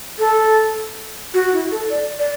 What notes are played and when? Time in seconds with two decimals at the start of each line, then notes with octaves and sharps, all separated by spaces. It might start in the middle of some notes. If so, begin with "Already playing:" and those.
0.19 A4
1.34 F#4
1.53 E4
1.71 A4
1.90 D5
2.19 D5